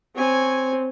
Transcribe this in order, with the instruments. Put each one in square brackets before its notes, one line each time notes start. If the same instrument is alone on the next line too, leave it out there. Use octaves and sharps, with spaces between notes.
[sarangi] C4 [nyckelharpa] C#5 G#5